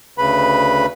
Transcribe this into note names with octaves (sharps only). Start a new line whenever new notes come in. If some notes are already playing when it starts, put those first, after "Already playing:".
D2 C#3 B4 B5